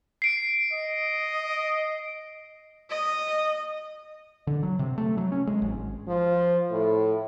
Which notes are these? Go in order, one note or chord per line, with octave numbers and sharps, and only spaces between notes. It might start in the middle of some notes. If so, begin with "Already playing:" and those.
C7 D7
D#5
D#5
D3
F#3
C3
A3
F#3
C#4
G#3
G#1
F3
A2